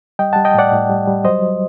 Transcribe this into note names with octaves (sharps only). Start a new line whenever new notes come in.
G3 D#5 G5
G3 F#5 A5
D#5 G5
A2 D5 F#5
A2
G3
G3
F#3 C5 D#5
F#3